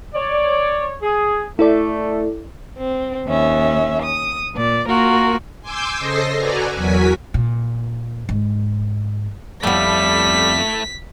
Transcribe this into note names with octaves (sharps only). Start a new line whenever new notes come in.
C#5 D5
G#4
A3 E4 A4 D5
C4
D#2 C#4 E5
D#6
A#2 D5
A#3 F4 F#4 A#4
G#5 C6 D6 E6 G6
C#3 A4 C5 D#5 A#6 C7
F#4 A4 B4 D5 G#5 A#5
E2 F#3 F#4 A#4 G#5 B6
A#2
G#2
F2 G3 A3 B3 E4 B6